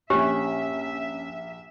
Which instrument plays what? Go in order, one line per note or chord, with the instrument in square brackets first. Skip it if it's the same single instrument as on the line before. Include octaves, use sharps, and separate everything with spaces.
[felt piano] A#1 F#6 [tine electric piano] C#4 [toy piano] G4 [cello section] E5